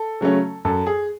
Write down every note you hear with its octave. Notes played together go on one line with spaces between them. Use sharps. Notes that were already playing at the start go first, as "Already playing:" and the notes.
Already playing: A4
C#3 F#3 A3 C#4
F#2 A4
G#4